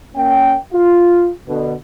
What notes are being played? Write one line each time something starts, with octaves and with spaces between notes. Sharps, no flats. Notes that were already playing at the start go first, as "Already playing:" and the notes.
A#3 C#4 G5
F4
B2 D3